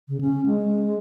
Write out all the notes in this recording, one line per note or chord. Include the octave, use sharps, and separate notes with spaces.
C#3
C#4
G#3